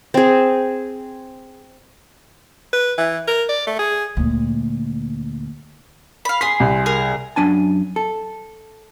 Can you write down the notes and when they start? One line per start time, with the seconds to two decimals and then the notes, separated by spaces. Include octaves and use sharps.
0.14 C4 G#4
2.73 B4
2.98 E3
3.27 A#4
3.49 D5
3.67 A3
3.79 G#4
4.17 D2 A#2
6.25 F5 B5
6.41 G#4 C6 B6
6.60 C2
6.86 G#4 A#4
7.36 F#2 D4 G#5 A5
7.96 A4